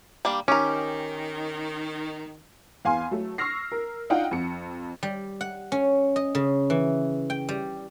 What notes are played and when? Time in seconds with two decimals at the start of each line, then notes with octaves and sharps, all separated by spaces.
0.25 G3 A#3 D4
0.48 D#3 C#4 G4 A#4
2.85 E2 F5 G#5 C6
3.11 F#3 A3
3.38 C#6 E6 F6 A#6 C7
3.72 A#4
4.10 D4 D#4 F4 F#5 G5
4.31 F2 C#7
5.03 G3
5.41 F#5
5.72 C#4
6.16 D#5
6.35 C#3
6.70 E3
7.30 G5
7.49 G3